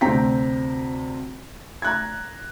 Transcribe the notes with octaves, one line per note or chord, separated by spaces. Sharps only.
D2 C3 C4 G5 A#5 B6
A#5 F#6 G#6